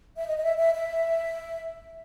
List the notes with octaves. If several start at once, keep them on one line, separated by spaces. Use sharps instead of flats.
E5
D#5
D#5
E5
E5
E5